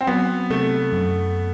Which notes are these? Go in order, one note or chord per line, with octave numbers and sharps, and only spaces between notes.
C4
F#3 B3
C3 A3
F#2